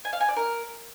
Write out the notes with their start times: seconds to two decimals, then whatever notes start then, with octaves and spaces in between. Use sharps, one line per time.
0.05 G#5
0.13 F5
0.21 G#5
0.28 D5
0.36 A#4